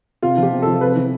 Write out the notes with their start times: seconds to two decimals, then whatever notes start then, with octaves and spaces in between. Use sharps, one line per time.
0.23 C3 F4
0.37 F3
0.43 G4
0.52 C3
0.62 F3 A4
0.81 C3 B4
0.96 E3